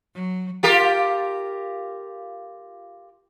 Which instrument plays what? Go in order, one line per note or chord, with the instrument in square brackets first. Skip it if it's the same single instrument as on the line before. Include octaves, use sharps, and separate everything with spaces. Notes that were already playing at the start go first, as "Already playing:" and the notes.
[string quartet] F#3
[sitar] F4 G4 A#4